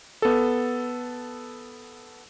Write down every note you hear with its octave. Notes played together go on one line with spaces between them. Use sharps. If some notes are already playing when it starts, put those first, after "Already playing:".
B3 A4